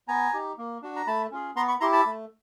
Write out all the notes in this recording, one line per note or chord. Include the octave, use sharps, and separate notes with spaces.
B3 G#5 A#5
D#4 G4
A#3
D4 F#4
A#5
A3 A5 B5
C#4 F4 G#4
B3 A#5 C6
B5 C#6
E4 G4 A#5 C6
A5 B5
A3